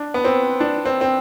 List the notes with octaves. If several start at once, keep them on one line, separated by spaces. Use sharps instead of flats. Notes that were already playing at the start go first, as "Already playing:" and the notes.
Already playing: D4
B3
C4
D4
C4
C4